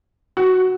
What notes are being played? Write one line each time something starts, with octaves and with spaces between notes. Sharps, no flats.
F#4